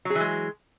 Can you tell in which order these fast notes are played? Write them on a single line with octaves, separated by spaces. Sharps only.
F#3 G#4 E3 G#3